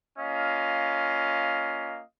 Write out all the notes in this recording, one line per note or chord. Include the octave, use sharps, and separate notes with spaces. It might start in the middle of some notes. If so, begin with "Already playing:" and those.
A#3 C#4 F4 D#5 F5